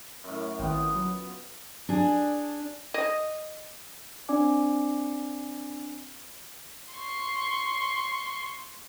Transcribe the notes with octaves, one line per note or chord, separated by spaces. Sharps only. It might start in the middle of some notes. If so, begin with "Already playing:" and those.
F#2 A2
G#1 B3 F4 G5
F#3
D4 G#4
D#5
C4 D4 D5 G#5 D6
C6 C#6